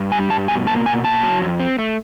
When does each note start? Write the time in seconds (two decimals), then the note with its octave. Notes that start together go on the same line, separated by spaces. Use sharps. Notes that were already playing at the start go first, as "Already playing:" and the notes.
Already playing: G2
0.12 G3 G#5
0.30 G2 A5
0.48 B2 G#5
0.67 A#3 A5
0.86 B2 G#5
1.04 A#3 A5
1.23 F#3
1.42 F2
1.60 C4
1.79 A3